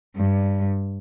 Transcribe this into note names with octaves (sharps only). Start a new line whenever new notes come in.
G2